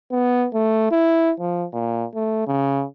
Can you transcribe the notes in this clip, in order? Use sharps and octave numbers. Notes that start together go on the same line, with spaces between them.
B3
A3
E4
F3
A#2
A3
C#3